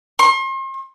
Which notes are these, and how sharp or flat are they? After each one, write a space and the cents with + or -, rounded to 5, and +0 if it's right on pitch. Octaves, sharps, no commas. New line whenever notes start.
C6 +40